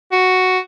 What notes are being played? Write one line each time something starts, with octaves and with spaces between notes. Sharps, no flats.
F#4